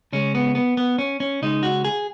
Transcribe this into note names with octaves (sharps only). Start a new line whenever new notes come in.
C#3 G#3 C#4
B3
B3
B3
C#4
C#4
C#3 G#3 D#4
F#4
G#4